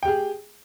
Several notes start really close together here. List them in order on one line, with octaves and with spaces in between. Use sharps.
G5 G4 G#4